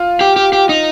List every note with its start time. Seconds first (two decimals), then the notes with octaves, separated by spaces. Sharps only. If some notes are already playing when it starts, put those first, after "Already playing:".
Already playing: F4
0.21 G4
0.36 G4
0.53 G4
0.69 D#4